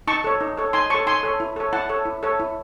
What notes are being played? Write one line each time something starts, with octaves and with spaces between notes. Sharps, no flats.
D#4 A5 C#6
A4 C#5
D#4
A4 C#5
D#4 G#5 C6
A4 C#5 A5 C#6
D#4 G#5 C6
A4 C#5
E4
A4 C#5
E4 F#5 A5
A4 C#5
E4
A4 C#5
E4